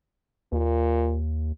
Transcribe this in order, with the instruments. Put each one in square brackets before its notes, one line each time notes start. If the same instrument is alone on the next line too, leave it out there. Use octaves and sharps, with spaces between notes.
[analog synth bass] D#2 [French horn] A#2